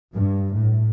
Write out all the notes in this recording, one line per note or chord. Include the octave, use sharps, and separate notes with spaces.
G2
A2